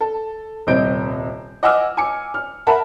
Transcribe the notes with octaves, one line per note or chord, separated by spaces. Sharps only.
A4
D#1 C2 C4 D#5 G6 D7
D#5 F#5 G#5 D6 E6 F6
G#5 D6 C#7
F6
A#4 E5 F#5 A5 B5